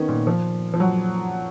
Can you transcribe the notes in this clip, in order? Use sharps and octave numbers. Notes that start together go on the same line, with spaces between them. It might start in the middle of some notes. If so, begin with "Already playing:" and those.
Already playing: D#3 B3 C#4
A#2
F3
F3
F#3